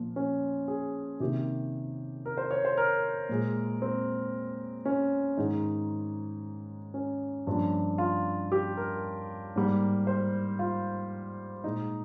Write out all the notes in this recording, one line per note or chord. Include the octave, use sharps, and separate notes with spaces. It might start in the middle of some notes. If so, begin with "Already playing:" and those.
Already playing: A#2 F3
C#4
G#4
C3 D#3 A#3 G4
A#4
C5
C#5
C5
A#4
A#2 G#3
C4
C#4
G#2 D#3 G#3 D#4
C#4
G2 F3 A#3
F4
G4
A#4
G#2 G3 A#3
C5
F4
A#2 G#3 D#4